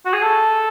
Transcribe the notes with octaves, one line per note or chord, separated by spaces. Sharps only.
F#4
G#4
A4